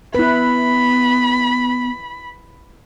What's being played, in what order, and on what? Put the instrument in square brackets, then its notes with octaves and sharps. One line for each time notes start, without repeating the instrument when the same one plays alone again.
[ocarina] B3 [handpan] E4 B4 [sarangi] B5